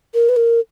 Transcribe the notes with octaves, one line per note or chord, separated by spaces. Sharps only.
A#4
B4
A#4